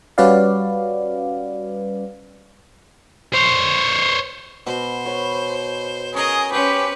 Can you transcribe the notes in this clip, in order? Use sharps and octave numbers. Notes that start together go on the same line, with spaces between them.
G3 C#4 F#4 B4 D5 F5
C5 C#5
B2 C5 C6
B4 C#5 B5
C#4 G#4 A#4 D#5
C#4 G4 B4 C5 C6